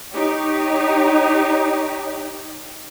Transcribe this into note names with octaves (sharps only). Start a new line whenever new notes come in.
D#4 G4 C#5